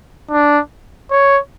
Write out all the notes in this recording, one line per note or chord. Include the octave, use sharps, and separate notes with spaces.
D4
C#5